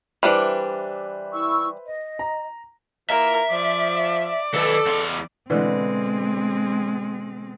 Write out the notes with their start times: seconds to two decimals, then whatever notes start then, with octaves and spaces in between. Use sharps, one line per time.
0.23 E3 G3 D4 B4 C5 E5
1.33 E4 C#6 E6
1.87 D#5
2.19 A#5
3.10 E3 A#3 F4 A#4 E5
3.51 F3 D5
4.24 D5
4.54 D#3 A4 B4
4.86 E2 C6
5.50 B2 D3 E3 G#3 C4